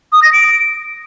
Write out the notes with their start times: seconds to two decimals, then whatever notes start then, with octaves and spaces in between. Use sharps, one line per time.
0.13 D#6
0.23 A#6
0.33 D7